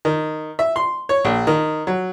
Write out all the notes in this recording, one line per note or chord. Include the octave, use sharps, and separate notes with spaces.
D#3
E5
C6
C#5
A#1
D#3
F#3